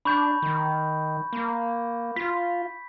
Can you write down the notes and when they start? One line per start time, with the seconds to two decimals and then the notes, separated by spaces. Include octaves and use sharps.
0.05 D4 B5 C#6 G6
0.42 D#3
1.33 A#3
2.16 F4 B6